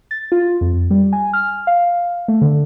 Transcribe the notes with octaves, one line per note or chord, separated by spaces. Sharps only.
A6
F4
F2
G3
G#5
F6
F5
A3
D3